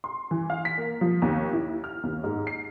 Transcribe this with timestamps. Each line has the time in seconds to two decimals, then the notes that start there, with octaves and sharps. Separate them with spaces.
0.04 C6
0.31 E3
0.50 F5
0.65 B6
0.78 A#3
1.01 F3
1.22 D#2
1.53 E4
1.84 F6
2.03 D#2
2.24 G#2
2.47 C7